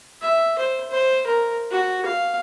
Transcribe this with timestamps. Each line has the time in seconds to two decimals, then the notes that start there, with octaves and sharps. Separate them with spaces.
0.22 E5
0.58 C5
0.90 C5
1.27 A#4
1.71 F#4
2.05 F5